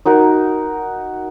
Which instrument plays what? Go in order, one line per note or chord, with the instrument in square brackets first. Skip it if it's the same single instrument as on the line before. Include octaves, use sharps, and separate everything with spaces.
[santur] D#4 F#4 A#4